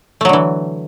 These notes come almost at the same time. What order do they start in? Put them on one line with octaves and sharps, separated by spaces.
A3 F#3 D3 E3